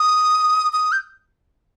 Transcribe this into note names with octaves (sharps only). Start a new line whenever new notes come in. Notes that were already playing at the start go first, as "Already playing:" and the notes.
Already playing: D#6
D#6
G6